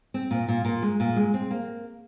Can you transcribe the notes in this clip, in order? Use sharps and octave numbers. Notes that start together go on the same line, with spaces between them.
C4
A#2
A#2
A#2
G#3
A#2
G#3
C4
A#3